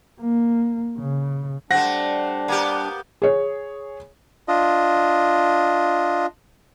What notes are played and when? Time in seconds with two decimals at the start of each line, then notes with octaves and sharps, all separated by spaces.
0.21 A#3
0.98 C#3
1.71 G3 A3 C4 D4 F#5 A#6
2.48 A#3 B3 G4
3.22 G#4 C#5
4.48 D4 F4 D#5